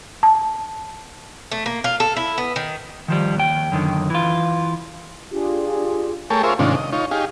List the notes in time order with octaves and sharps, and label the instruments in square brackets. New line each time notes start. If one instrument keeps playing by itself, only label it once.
[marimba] A5
[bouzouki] A3
A#3
F4
A4
E4
B3
D#3
[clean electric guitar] D#3 F3 G3
D#2 G5
F#2 D3 D#3
E3 F4
[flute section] D4 F4 G4 G#4
[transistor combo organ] A3 G#4 A#4 C#5 G5 A5
F4 G#4 A#4 C5 C#5 E5
G#2 C3 D#3 C#4 D4 F4
D#5
D#4 F4 C#5
D#4 G4 G#4 F5